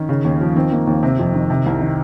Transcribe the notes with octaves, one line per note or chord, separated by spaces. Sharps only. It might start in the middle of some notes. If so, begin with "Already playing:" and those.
Already playing: D#3 C#4
C#3
D#2
F3
D#3 C4
D#3 A#3
D#2 A#3
C3 C4
F2
D#3
C3
C2
D#3